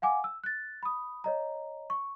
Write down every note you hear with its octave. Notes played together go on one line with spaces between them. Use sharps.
F5 F#5 G#5 D6
E6
F#6 A6
B5 D#6
C#5 D#5 A#5
C#6